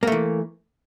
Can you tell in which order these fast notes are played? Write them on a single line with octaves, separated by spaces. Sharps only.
A#3 A3 E3